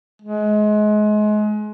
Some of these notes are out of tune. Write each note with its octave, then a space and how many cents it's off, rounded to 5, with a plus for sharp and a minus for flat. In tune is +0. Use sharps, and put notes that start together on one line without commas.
G#3 +30